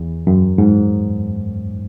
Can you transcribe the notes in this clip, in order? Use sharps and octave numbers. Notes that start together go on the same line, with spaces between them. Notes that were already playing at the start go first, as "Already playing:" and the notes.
Already playing: E2
F#2
G#2